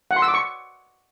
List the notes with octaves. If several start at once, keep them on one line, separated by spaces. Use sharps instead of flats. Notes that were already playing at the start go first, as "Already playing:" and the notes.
F#5
C6
E6
D6
C#6